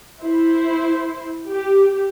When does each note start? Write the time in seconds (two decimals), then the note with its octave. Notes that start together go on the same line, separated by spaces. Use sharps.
0.22 E4 C5
1.50 G4